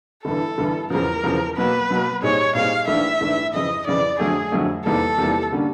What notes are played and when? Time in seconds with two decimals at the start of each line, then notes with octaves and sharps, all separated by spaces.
0.25 G1 G2 E3 A4
0.58 G1 G2 E3
0.90 E2 C#3 F3 A#4
1.24 E2 C#3 F3
1.57 B2 F#3 A#3 B4
1.90 B2 F#3 A#3
2.22 A#2 G3 C4 D#4 G#4 C#5
2.55 A#2 G3 C4 D#4 G#4 F5
2.88 A#1 G#2 E3 A3 D4 E5
3.21 A#1 G#2 E3 A3 D4
3.53 F2 C#3 E3 D#5
3.87 F2 C#3 E3 D5
4.19 F2 D3 F#3 A3 G#4
4.52 F2 D3 F#3 A3
4.86 E2 C3 D#3 G3 A#3 A4
5.18 E2 C3 D#3 G3 A#3
5.52 D3 G3 A#3 C#4